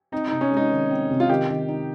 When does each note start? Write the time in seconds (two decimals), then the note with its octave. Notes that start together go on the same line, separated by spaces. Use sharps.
0.12 C4 D#4
0.28 C3 D#4
0.41 C#4
0.52 G#3
0.57 D#4
0.71 D#3
0.90 C4
1.11 C3
1.20 F4
1.29 D#3 G4
1.49 D#3
1.68 D#4